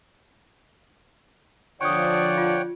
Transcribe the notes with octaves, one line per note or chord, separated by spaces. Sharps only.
D3 F3 C#5 D5 F#5 G5 C#6 D#6
F4